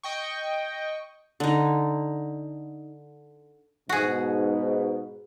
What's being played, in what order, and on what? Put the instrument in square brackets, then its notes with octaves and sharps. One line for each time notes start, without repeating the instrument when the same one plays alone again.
[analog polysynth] D#5 G5 C#6
[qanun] D3 D#4
[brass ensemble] G#2 B2 [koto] F#4 G#4